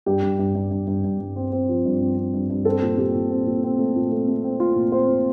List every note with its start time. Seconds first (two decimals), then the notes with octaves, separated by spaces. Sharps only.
0.06 G2 G4
0.22 G2
0.39 G2
0.55 G2
0.71 G2
0.87 G2
1.04 G2
1.20 G2
1.36 C4
1.52 C4
1.69 F3
1.85 G2
2.01 C4
2.16 C4
2.34 G2
2.50 G2
2.65 C4 A4
2.82 A#2
2.98 A#2 G4
3.15 A#2
3.31 C4
3.46 A#2
3.63 C4
3.78 A3
3.96 A#2
4.11 A3
4.28 A3
4.44 C4
4.60 A3 F4
4.76 A#2
4.92 C4 C5
5.08 A#2